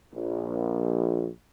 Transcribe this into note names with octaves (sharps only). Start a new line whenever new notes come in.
A#1